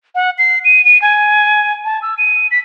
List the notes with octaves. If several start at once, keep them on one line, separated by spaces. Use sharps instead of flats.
F#5
C7
D#7
D#7
G#5
A5
E6
D#7
B6